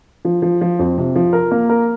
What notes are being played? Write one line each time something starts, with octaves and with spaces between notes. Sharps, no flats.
F3
F3
F3
F2
C3
F3
A#4
A#3
A#4